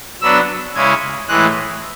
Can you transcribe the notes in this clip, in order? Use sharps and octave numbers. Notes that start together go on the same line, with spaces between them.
F#3 B3 D4 E6
C#3 G#3 C#4 E4 G#6
A2 E3 G#3 F#6